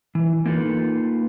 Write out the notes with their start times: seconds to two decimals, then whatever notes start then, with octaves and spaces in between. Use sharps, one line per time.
0.15 E3
0.46 A#3 D#4 F4 A4 B4